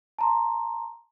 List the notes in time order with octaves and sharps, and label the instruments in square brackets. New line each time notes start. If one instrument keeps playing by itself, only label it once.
[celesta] A5 A#5 C6